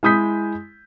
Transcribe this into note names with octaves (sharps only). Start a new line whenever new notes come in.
G#3 E4 D#6 G6 B6